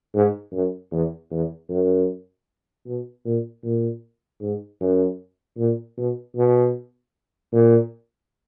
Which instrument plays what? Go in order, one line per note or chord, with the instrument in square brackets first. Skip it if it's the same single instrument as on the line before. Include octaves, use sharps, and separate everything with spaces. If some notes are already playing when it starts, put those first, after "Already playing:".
[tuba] G#2
F#2
E2
E2
F#2
B2
A#2
A#2
G#2
F#2
A#2
B2
B2
A#2